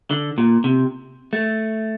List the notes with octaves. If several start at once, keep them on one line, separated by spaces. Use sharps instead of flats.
D3
A#2
C3
A3